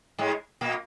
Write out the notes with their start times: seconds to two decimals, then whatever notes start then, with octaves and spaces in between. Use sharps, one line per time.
0.18 G#2 G#3
0.61 A#2 A#3